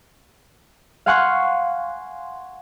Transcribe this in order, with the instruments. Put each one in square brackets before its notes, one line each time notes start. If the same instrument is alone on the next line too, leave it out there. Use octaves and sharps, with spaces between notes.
[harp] F5 F#5 G#5 C6 C#6 F#6